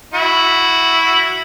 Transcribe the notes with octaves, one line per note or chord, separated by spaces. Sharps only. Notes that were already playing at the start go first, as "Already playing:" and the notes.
E4 F#4